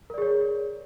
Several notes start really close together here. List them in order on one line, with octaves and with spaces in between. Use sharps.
A#4 D5 G#4 C#5